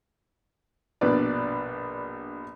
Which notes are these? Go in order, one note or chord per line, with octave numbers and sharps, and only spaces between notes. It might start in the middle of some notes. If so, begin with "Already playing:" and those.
A#1 G2 B2 B4 D5